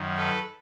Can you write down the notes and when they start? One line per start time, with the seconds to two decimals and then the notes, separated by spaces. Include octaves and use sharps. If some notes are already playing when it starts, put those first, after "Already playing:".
Already playing: F#2 D#3
0.17 A4 B4